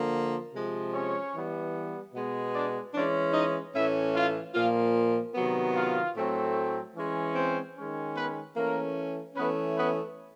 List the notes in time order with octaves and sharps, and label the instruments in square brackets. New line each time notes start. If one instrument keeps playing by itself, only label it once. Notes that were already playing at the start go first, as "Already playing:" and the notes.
Already playing: [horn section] D3 F3 A#3
C3 F3 G#3
C#4 C#5
E3 G3 B3
B2 G#3 B3
D4 D5
E3 G#3 C#4 D4 D5
D#4 D#5
A2 E3 A3 C#4 E4 E5
F4 F5
A#2 F3 A#3 F4 F5
C3 D#3 F#3 B3
F4 F5
A2 F#3 A3 C4
E3 G#3 C#4
C4 C5
D#3 G#3 C#4
B3 B4
E3 A3 A#3 C#4 A#4
E3 A3 B3 C#4 B4
B3 B4